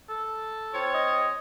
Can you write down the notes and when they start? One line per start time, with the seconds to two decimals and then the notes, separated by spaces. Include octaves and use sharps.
0.09 A4
0.73 C4 F4 C#5
0.94 D#5